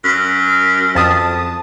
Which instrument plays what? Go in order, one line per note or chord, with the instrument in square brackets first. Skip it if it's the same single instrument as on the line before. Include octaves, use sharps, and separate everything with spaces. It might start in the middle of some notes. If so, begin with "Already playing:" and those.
[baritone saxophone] F#2
[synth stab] F2 A5 D#6